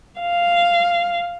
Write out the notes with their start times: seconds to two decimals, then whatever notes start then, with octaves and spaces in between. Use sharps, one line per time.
0.21 F5